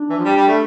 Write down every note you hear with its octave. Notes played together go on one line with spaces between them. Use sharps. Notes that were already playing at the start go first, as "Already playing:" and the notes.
Already playing: D4
E3
F3
G3
G3
A3